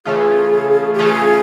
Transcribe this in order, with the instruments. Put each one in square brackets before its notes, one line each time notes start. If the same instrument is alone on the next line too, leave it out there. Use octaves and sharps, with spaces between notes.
[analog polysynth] C#3 E3 A3 C#4 F4 [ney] G#4
[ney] G4
[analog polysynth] C#3 E3 A3 C#4 F4 [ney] G#4